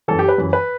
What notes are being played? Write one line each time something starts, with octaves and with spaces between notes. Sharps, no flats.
F#2 E3 A4
G4
B4
F#2 E3
B4